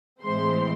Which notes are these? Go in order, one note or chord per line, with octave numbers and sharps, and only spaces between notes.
A2 E3 G#3 C4 C5 C6